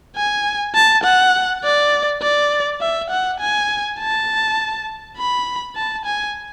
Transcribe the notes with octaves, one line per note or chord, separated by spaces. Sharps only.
G#5
A5
F#5
D5
D5
E5
F#5
G#5
A5
B5
A5
G#5